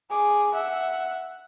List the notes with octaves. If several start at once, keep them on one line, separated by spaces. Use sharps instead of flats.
G#4 D6
E5 F#5